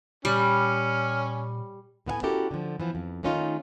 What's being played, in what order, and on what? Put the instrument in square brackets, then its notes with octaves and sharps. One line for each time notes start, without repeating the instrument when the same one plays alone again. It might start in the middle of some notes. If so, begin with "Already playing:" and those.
[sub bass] A#2 [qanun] G3 [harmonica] C#4 [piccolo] F6
[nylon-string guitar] A2 B3 F5 G#5
C#4 E4 F#4 G4 A4 A#4
D3 F3
E3 F3 B3
F2
D#3 A3 C#4 D#4 F4